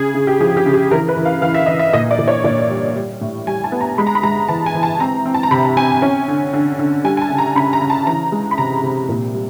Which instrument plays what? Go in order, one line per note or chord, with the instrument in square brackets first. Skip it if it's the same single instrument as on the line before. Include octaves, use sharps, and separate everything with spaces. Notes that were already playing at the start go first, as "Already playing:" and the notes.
Already playing: [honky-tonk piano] C#3 G#4
C#3
G4
F3 G#4
G4
C#3
G#4
E3 A#4
B4
E3
F5
E3 F5
E5
E3 D#5
E5
A#2 D#5
D5
A#2
C#5
A#2 D5
G3
G3
A2
G3 G#5
A5
B3
A#5
G#3 B5
A#5
B5
G#3 A#5
E3 A5
G#5
E3
A5
C4 A#5
C4
A5
A#5
C3 B5
C4 G#5
C#4
D3
D3
D3
G3 G#5
G#5
A5
C#3
A#5
C#3 B5
A#5
C#3
A5
E3 A#5
G#3
B5
C3 A#5
C3
A#2
G3